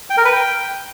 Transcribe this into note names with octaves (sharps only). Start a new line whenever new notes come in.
G5
A#4
B4
G5